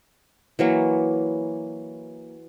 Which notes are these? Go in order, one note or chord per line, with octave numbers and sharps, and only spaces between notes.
E3 F#3 A#3 C#6